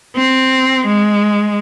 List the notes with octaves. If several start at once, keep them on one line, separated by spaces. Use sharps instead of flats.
C4
G#3